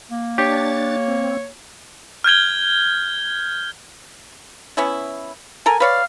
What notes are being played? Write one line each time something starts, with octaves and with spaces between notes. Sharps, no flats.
A#3
D4 G4 C#5 A6
C4
F6 G6 G#6 G7
B3 C#4 E4
A4 A#4 G#5
B4 C#5 D5 F5